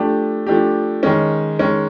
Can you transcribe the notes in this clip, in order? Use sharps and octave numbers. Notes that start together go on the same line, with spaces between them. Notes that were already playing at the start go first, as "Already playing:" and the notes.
Already playing: F3 A3 D4 G4
F3 A3 D4 G4
D#3 G#3 C#4
D#3 G#3 C#4